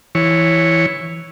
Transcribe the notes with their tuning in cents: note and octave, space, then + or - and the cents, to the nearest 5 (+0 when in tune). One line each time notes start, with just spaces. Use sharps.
E3 +0 C#5 +0